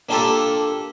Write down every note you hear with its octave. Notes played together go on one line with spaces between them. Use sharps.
A#3 D4 F4 G4 A4